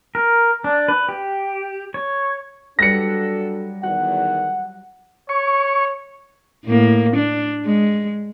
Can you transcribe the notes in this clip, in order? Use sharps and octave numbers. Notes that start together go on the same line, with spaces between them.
A#4
D4
B4
G4
C#5
F#3 G3 D4 F#4 A4 B4 A#6 C#7
E2 D#3 F#4 F#5
C#5 C#6
A2 A#3
D4
G#3